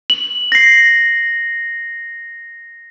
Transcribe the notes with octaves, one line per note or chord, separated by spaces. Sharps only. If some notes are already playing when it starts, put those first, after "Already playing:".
F#7
A#6 C7